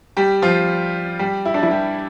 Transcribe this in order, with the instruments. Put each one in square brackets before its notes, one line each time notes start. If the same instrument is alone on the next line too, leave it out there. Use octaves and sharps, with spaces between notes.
[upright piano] G3 G4
F3 F4
G3 G4
E4
D4
E3 E4
G3 G4